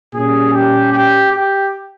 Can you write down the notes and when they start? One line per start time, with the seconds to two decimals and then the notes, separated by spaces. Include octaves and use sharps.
0.14 A#2 G3 C#4 G#4
0.53 G4
0.92 G4
1.32 G4